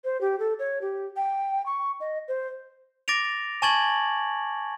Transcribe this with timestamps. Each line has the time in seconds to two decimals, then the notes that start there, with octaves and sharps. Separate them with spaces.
0.04 C5
0.21 G4
0.39 A4
0.59 C#5
0.81 G4
1.16 G5
1.66 C#6
2.00 D#5
2.28 C5
3.08 D6 A6 A#6 D7 F7
3.62 G#5 A5 C#6 G#6 A6 F#7